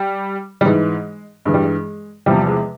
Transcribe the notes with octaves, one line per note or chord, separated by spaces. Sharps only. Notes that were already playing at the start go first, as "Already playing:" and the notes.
Already playing: G3
G3
G#2 E3 G#3
G2 E3 G#3
G3
G#3
E2 C3 F3 G3
G#3